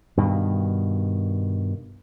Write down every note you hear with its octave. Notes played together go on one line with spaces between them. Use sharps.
G2 B2 D#3